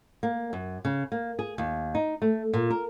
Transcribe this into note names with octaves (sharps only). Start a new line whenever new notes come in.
A#3
F#2
C#3
A#3
G#4
D#2
D#4
A3
A#2
A#4